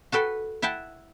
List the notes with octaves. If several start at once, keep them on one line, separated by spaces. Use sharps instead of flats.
F#4 A4 B4 G5
E4 E5 F#5 G5 A5